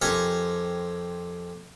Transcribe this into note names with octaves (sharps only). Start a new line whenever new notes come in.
F2 G4 A#4 C5 G#5 C#6